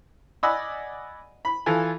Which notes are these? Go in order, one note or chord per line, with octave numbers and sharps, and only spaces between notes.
D5 D#5 F#5 G#5 B5 E6
B5
E3 F4 A4 G#5